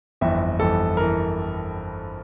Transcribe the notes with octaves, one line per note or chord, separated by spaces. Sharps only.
G1 F2 E3 E5
G1 F2 E3 A4
E3 A#4